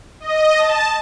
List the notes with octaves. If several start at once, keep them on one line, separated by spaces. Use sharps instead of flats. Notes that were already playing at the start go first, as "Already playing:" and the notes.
D#5
A5